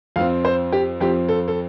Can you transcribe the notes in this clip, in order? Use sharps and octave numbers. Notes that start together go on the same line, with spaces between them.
F2 F3 C4 F5
C5
G4
F2 F3 C4 G4
A4
A4